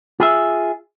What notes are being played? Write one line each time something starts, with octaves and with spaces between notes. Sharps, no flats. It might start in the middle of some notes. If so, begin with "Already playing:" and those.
F4 G#4 E5